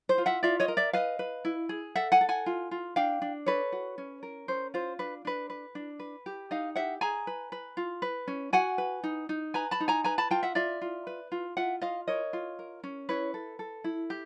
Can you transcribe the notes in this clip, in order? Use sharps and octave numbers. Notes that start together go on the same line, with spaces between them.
C5
F4
E5 F#5
F4 D5 E5
C#5 D#5
A#4
D5 E5
B4 D#5 F5
B4
E4
G#4
A4 E5 F#5
F#5 G#5
A4
F#5 G#5
F4
F4
D4 F5 G5
D4
A4 B4 C#5
F#4
C#4
A#4
C#4 C5
F4 C5
D4 B4
D4 B4
B4
D4
B4
G4
D#4 D#5 F5
G4 E5 F#5
G#4 G#5 A#5
B4
B4
F4
B4
C#4
F#4 F#5 G#5
B4
D#4
D#4
B4 G#5 A#5
A5 B5
D#4
G#5 A#5
B4 G#5 A#5
A5 B5
F4 G5 A5
E5 F#5
F4 D5 E5
F4
B4
F4
F4 E5 F#5
F4 D#5 F5
A#4 C#5 D#5
F4
A#4
C#4
E4 B4 C#5
A4
A4
E4
G4